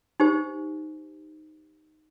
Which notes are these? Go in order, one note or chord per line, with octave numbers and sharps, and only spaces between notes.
D#4 G4 C5